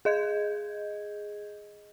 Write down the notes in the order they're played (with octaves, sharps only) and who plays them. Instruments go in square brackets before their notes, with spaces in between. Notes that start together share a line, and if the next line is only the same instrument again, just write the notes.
[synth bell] G#4 D#5 G6 G#6